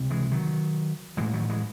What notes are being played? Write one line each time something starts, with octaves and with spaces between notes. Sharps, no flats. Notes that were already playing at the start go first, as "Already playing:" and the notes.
Already playing: C#2 C3
E3 G#3
D#3 F#3
A1 A2 E3 G#3
D#3 F#3
E3 G#3